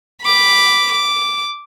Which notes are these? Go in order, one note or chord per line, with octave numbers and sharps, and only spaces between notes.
B5 D6
D6